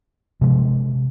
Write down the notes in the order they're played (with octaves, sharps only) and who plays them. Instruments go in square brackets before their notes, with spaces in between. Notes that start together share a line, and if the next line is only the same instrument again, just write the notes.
[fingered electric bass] C3 F3 G#3